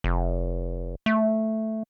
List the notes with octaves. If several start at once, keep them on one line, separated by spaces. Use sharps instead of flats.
F1
A3